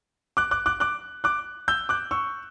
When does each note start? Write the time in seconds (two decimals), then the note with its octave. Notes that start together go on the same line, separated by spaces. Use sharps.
0.37 D6 F#6
0.51 D6 F#6
0.66 D6 F#6
0.80 D6 F#6
1.24 D6 F#6
1.68 E6 G6
1.89 D6 F#6
2.11 C#6 E6